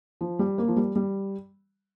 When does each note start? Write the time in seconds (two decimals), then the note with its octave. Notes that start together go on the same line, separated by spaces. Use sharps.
0.21 F3
0.39 G3
0.58 A#3
0.68 F3
0.77 G3
0.96 G3